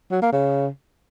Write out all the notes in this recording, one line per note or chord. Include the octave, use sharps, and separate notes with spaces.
F#3
A#3
C#3